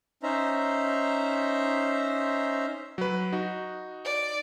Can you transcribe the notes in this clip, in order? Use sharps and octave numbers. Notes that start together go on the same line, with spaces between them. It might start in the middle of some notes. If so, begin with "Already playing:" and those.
C#4 D#4 C5 E5 A#5
F#3 B4
D#4 F#4
D5